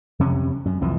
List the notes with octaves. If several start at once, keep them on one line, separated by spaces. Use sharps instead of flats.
F2 C3 C#4
F#2
C2 F2 E3